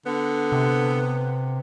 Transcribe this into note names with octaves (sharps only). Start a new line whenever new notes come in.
D3 B3
C3